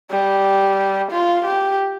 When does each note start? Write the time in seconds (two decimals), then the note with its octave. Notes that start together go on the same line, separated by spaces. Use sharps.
0.10 G3
1.11 F4
1.45 G4